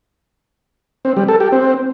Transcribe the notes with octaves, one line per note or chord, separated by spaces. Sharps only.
C4
G3
A4
G4
C4